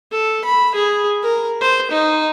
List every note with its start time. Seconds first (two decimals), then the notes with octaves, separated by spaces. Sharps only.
0.11 A4
0.44 B5
0.75 G#4
1.23 A#4
1.61 C5
1.91 D#4